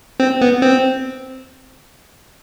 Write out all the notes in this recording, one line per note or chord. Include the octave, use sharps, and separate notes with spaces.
C4
B3
C4